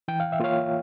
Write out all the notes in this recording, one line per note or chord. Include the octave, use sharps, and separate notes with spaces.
E3 G5
F5
E5
A#3 F4 C#5 F5